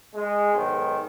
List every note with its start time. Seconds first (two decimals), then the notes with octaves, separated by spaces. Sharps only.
0.15 G#3
0.53 B1 G#2 D#3